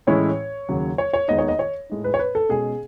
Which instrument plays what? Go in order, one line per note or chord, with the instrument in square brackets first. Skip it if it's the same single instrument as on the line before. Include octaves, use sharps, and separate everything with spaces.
[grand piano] A2 E3 G#3 C#4 E4 [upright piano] C#5
[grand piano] D#2 C#3 F#3
[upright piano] C#5
C#5
[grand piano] D#2 D#3 G#3 B3 D#4 [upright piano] D#5
[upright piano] C#5
D#5
C#5
[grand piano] A2 G#3 D#4
[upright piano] B4
C#5
B4
A4
[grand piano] B2 G#3 C#4 [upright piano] G#4